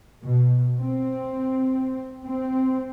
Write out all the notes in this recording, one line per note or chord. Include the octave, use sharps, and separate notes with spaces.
B2
C4
C4